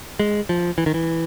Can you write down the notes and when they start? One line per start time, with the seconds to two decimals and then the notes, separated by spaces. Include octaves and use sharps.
0.20 G#3
0.49 F3
0.78 E3
0.86 D#3
0.94 E3